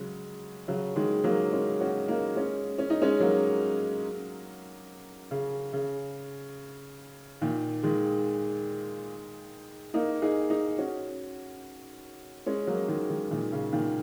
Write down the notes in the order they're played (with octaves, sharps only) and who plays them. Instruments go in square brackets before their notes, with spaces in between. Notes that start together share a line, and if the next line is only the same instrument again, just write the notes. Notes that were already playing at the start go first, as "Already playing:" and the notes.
Already playing: [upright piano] C#3 F#3 G#3
C#3 F#3
D#3 G#3
F#3 A#3
G#3 C#4
C#4 F#4
A#3 D#4
G#3 C#4
C#4
D#4
G#3 C#4
F#3 A#3
C#3
C#3
A#2 D#3
D#3 G#3
A#3 D#4
D#4 G#4
D#4 G#4
C#4 F#4
G#3 C#4
F#3 A#3
D#3 G#3
D#3 G#3
A#2 D#3
C#3
A#2 D#3